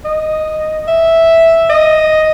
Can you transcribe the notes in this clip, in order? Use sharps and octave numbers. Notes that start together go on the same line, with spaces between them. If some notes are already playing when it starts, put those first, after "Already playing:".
D#5
E5
D#5